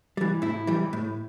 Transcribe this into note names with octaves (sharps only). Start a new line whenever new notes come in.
E3 G3
A2 E4
E3 G3
A2